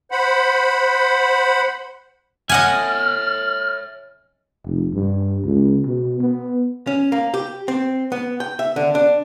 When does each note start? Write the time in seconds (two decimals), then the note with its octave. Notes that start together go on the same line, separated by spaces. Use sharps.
0.12 C5 F#5 B5
2.49 C#5 D#5 E5 F#5 G#5 F6
4.65 F1
4.94 G2
5.44 C#2
5.85 B2
6.20 B3
6.87 C#4
7.12 A#3
7.34 G4
7.68 C4
8.12 B3
8.40 G5
8.59 E5
8.76 D3
8.95 D4